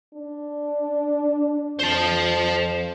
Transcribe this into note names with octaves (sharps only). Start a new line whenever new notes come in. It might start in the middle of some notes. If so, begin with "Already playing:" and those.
D4
F2 C5 A5